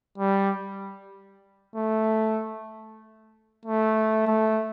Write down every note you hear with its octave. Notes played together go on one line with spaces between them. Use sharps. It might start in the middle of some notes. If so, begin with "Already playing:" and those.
G3
A3
A3
A3